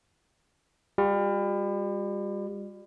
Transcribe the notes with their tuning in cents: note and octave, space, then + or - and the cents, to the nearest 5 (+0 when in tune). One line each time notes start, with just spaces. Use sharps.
G3 +35 F#4 -40